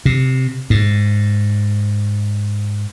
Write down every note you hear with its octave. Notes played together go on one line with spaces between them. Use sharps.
C3
G#2